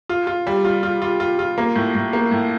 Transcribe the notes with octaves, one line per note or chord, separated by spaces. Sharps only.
F4
F4
G3
F4
F4
F4
F4
F4
A#3
A2
A2
A#3
A2